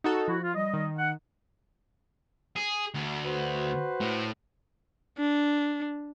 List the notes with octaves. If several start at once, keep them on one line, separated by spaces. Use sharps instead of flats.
D#4 F#4 A4
F3 E4 F#4
F4
G3 D#5
D#3
F#5
G#4
D2
F#4 B4 C5
A2
D4